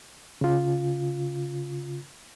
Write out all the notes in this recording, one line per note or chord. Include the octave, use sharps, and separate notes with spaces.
C#3 F4